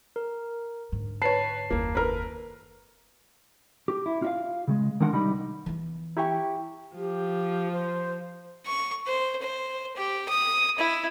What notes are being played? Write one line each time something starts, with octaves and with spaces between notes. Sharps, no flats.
A#4
G#2 D3
B4 C#5 A5 C7
F#1 D#2 A#3
A#4 B4
G4
E4
F4 E5 F5
C#3 F#3 G#3
D#3 G#3 D4 A#4 F#5 C6
C2 G3 D#4 D#5 B5
E3 B3
E4 G4 G5 A#5 C#6
F3 G4
C5
C#6
C5
C5
G4
D#6
E4